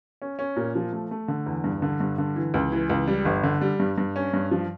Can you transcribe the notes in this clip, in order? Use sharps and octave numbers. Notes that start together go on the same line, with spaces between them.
C#4
C#4
A#2
F3
A3
A3
D3
E2
G2
D3
G2
D3
E3
C#2
E3
C#2
G3
G1
D3
G3
G2
G2
C#4
G2
F3